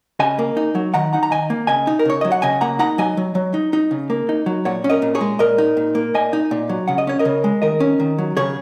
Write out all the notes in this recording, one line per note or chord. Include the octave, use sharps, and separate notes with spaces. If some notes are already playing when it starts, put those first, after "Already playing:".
C#3 D#5 G#5
A#3
D#4
F#3
D#3 F#5 A#5
D#4 F#5 A#5
A#5
D#3 D#5 G#5
A#3
C#3 D#5 G#5
D#4
A#4
C#3 C#5
F#3 D#5
F#5
C#3 D#5 G#5
A#3 F#5 A#5
D#4 F#5 A#5
F#3 D#5 G#5
F#3
F#3
D#4
D#4
C#3
A#3
D#4
F#3
A#2 C#5 F#5
C#4
A#4 D#5
A#2
G#4 C#5
G#3
A#2 A#4 D#5
D#4
A#2
A#3
A#2 D#5 G#5
D#4
A#2
F#3
C#3 F#5
D#5
C#4 C#5
A#4 D#5
C#3
G#3
D#3 A#4 D#5
C#4
D#3
F#3
C#3 G#4 C#5